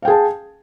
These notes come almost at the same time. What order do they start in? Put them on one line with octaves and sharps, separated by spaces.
F5 G5 G#4 A5